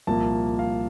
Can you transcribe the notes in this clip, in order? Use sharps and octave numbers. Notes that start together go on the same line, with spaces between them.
C2 A#2 F3 A#3 A5
F5